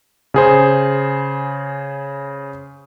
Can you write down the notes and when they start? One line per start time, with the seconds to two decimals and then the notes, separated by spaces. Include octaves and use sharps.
0.34 C#3 G#4 C5